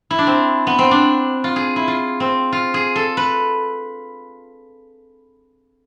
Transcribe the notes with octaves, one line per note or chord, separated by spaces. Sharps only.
E4
D4
C4
B3
C4
D4
F4
G#4
E4
F4
C4
F4
G#4
A4
B4